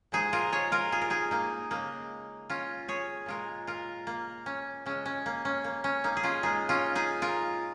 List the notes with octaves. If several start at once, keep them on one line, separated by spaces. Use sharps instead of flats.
A#2 F3 G#3 D#4 G#4
F4 A#4
G#4 C#5
F4 A#4
G#4
A#4
D#4 G#4
A#3 D#4
C#3 G#3 A#3 D#4
C#4 F4
G#4 C#5
A#2 G#3 F4 A#4
F4 A#4
A#3
C#4
C#3 G#3 C#4
C#4
A#3
C#4
A#3
C#4
A#3 D#4
G#4
C#4 F4
A#2 G#3 D#4 G#4
C#4 F4
D#4 G#4
F4 A#4